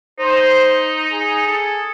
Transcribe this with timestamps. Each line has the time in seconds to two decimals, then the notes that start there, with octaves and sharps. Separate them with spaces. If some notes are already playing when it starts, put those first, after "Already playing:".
0.19 D#4 C5
1.11 G#4
1.47 A4